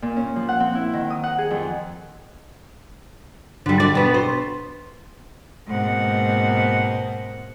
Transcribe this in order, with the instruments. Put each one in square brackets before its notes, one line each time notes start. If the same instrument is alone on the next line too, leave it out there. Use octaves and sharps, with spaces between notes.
[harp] A#2
C#4
F3
F#5
C4
E4
D#3
D#6
F#5
G#4
F2
[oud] D3 G3
D5
B2 B3
C5
[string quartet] G#2 B2 A#3 C4 F#5